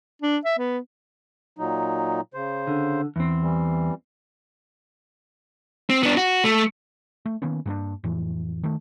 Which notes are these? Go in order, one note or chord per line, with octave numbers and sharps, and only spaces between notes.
D4
E5
B3
A#2 F#3 D#4
C#3 C5
D3
E2 C4
E3 G3
C4
B3 D4
F#4
A3
A3
D#3 A#3 B3 C#4
G2 A#3 B3 D4
F2 A2 E3
D#3 A3